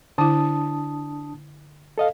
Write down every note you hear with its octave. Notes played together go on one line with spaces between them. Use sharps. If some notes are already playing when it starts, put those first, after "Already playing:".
D3 D4 E4 A5 D#6
A4 D#5 F5